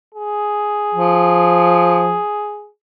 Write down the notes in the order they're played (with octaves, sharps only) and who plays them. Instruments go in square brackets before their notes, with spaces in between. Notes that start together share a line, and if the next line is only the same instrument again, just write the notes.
[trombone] G#4
[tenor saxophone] F3